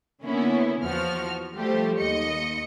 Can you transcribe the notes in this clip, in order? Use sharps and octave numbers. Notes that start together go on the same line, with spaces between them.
D3 A#3 B3 C#4 E4
E2 F3 F#4 F6
F3 G3 A3 G4 C5
D#2 D#5 C#7